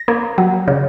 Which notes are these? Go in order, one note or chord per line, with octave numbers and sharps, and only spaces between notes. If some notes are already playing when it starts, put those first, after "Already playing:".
Already playing: A#6
A#3
F#3
C#3